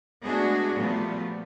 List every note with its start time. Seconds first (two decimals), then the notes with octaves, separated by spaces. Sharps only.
0.23 G#3 A3 B3 D4 F#4 G#4
0.76 A#2 F3 G3 A3 B3